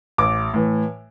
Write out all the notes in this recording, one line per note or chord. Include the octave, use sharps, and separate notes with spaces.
A1 D6
A2 E3